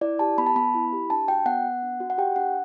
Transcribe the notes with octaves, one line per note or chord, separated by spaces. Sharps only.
E4 D5
G4 A5
B3 B5
A5
B3 B5
E4
G4
D4 A5
F#4 G5
B3 F#5
B3
D4
F#4
F#5
G4 G5
D4 F#5